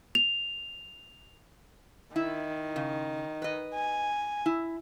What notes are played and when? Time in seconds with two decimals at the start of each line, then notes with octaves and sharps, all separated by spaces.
0.15 F7
2.16 D#3 E4
2.76 C#3
3.42 B4 D#5
3.74 G#5
4.46 E4